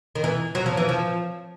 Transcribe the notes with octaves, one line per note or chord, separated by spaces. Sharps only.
D#3
E3
F#3
F3
E3
F3